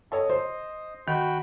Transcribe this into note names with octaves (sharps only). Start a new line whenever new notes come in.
A4 C#5 D#5
C5
D#3 F#4 G5 B5